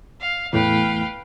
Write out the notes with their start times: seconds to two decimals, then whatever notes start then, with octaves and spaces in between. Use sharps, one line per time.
0.20 F5
0.53 E2 A2 B4 F5 G5